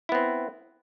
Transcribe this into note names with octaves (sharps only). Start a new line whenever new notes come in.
B3 C4 E4